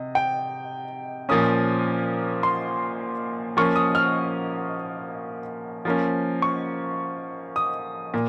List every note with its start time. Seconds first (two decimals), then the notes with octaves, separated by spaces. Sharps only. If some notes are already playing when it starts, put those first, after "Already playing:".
Already playing: C3 D#5
0.15 G5
1.29 A#2 F3 A#3 C#4 D#6
2.43 C6
3.57 F3 A#3 C#4 C#6
3.76 D#6
3.95 F6
5.85 F3 A#3 C#4
6.42 C#6
7.56 D#6
8.14 A#2